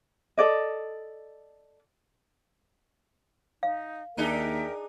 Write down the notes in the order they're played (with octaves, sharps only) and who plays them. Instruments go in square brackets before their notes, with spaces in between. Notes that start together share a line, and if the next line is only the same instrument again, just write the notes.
[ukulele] A4 D5 D#5
[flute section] D#4 [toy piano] F5
[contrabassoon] D#2 [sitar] D4 D#4 G#4 [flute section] A#4 E5 G5